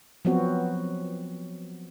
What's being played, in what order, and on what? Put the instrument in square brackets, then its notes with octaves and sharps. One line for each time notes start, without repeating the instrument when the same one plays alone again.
[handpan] F3 F#3 B3 C4 F#4